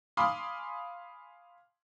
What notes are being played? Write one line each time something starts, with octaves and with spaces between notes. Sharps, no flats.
F5 G#5 B5 C6 D6 D#6